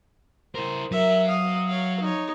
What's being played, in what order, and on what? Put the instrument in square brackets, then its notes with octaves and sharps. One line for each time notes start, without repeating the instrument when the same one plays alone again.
[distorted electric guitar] E4 A#4 [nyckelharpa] C5
[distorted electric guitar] F#3 [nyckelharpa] A#4 E5
[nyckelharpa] F5 D#6
C#5 F5
D#4 C#5